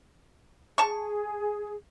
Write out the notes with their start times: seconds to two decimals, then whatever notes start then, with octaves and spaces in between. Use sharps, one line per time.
0.78 G#4 A5 C#6